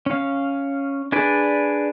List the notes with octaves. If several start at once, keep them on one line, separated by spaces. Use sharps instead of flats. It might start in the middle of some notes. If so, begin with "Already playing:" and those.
C#4 F5
D4 G#4 B4 D5